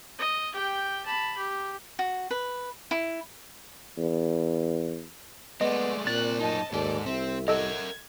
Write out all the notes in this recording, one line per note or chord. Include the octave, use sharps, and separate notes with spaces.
D#5
G4 G5
A5 B5
G4
F#4
B4
E4
E2
G#3 A3 B3 D5 D#5
A#2 C4 D5 F#6 A6
F#2 D#4 D#5 A5
D#2 G#2 A4 D5 D#5
C2 C4 E5
A4 A#4 D#5 E5 F#5 G#6